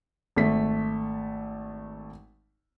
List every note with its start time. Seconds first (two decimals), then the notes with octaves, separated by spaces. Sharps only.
0.37 G#1 A3 B6